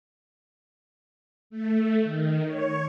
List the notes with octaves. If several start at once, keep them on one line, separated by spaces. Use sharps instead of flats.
A3
D#3
C#5